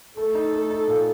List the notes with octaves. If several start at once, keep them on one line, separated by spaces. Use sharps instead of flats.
A3 A4
D#4
A3
D#4
A#2